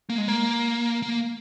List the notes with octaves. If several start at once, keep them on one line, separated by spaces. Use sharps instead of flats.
A#3
G#3
A#3
A#3